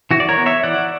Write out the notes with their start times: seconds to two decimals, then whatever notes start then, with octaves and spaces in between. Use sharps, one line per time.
0.11 E3 F#4
0.20 D5
0.29 A#4 C#5
0.37 B3
0.46 C#5 E5
0.64 E3 D5 F#5